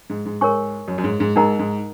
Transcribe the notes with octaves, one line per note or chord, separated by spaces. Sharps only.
G#2
G#2
G#2 A#4 C#5 G#5 C#6
F#2
F#2
G#2
G#2
G#2 D#4 A#4 D#5 F#5 A#5
G#2